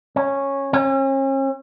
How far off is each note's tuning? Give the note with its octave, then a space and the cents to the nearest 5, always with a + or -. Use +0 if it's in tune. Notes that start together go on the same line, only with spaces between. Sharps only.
C#4 -10
C#4 -40